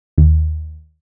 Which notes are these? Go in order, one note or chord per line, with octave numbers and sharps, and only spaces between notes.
D#2